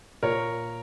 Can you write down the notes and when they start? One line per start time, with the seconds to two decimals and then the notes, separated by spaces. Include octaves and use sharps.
0.23 A#2 A#4 C#5